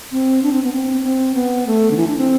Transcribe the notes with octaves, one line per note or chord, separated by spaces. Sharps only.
C4
D4
C4
B3
C4
C4
B3
A3
D3
E3
D4
C4